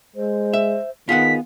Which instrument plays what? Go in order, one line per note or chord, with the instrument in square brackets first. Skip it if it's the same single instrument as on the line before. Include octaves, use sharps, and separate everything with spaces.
[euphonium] G#3 [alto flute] C5
[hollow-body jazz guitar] E5
[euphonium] D#3 [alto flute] B3 [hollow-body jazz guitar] F4 G#4 F#5 [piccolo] B6